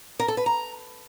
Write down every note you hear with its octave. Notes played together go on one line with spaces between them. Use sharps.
A#4
A4
B4
A#5